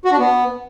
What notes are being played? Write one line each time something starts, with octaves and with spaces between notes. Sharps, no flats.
F#4
D4
B3